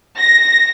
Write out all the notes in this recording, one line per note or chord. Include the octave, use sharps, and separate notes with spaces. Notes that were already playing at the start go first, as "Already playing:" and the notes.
A#6